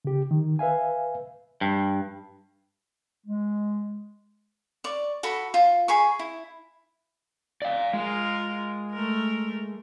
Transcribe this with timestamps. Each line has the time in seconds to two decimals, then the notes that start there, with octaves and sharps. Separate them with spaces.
0.05 C#3 G4
0.31 D#3
0.59 B4 E5 F5 G#5
1.61 G2
3.27 G#3
4.84 D5 C#6
5.23 F#4 A4 B5
5.54 F4
5.88 G#4 B5 C#6
6.19 E4
7.62 D5 F5
7.93 G#3 F4 A#4
8.92 A3 A#4